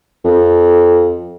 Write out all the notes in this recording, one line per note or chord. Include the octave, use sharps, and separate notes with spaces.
F2